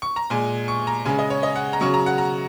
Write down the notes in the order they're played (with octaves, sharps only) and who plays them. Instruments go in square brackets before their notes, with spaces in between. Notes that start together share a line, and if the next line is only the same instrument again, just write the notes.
[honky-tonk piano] C#6
A#5
A#2 G#3 G#5
C#6
A#5
C#3 G#3 G#5
D#5
C#5
D#5
F#5
A#5
C#3 F#3 C#6
A#5
F#5
A#5